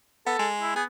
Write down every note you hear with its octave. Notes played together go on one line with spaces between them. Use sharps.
B3 A4
G#3
E4
B3 G#4